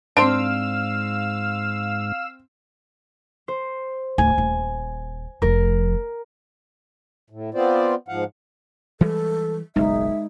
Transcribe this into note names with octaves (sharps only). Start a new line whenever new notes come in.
G#2 C4 D4 C5 F5 C6 E6 D7
C5
D1 G#5
D#1
F1 F3 A#4
A2
B3 C4 F4 C5 D5
G#2 F3 F5 F#5
E3 G3 G#3 A4
F#1 B1 G#3 D#4 E5